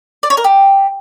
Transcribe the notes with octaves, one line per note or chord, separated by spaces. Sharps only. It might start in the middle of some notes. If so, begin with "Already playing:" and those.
D5
C#5
A#4
G4